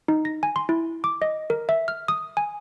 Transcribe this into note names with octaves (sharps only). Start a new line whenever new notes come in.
D#4
A#6
G#5
C6
E4
D6
D#5
A#4
E5
F6
D#6
G#5